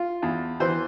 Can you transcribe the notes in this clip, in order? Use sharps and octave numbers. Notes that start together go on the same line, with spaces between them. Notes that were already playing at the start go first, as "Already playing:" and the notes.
Already playing: F4
E2
E3 C5